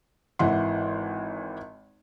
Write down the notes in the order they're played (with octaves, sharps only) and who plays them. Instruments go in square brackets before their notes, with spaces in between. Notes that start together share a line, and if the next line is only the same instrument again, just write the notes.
[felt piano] G#1 E3 F#5 C6